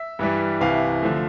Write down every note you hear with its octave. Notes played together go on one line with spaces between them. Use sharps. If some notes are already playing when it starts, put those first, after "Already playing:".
Already playing: E5
G2 E3 G3
C2 C3 E3 F5
D3 F3 A3